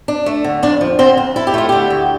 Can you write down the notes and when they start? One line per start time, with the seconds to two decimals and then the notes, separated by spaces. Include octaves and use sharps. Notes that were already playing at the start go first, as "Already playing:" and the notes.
0.08 D4
0.26 A3
0.44 D3
0.63 F2 D4 D5
0.81 F3
0.99 D3 C4 C5
1.17 F2
1.36 E4 A4
1.47 G4
1.54 A3 F4
1.69 D3 G4
1.90 D2